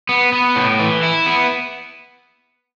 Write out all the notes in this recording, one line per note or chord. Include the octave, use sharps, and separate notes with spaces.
B3
B3
A2
E3
E4
B3